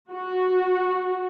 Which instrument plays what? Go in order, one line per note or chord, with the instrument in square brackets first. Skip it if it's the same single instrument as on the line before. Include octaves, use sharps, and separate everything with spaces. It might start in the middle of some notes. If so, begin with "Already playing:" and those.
[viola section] F#4